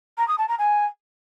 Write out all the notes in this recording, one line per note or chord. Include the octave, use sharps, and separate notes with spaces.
A#5
D#6
A5
A#5
G#5